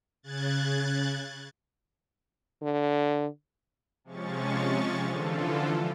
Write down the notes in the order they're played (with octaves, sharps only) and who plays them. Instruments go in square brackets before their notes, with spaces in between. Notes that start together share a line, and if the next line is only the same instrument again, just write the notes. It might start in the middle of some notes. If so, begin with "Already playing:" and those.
[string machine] C#3 F#6 G#6 A6
[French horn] D3
[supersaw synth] C3 F3 G#3 C#4 C#6 A6
D3 E3 F3 F4 A4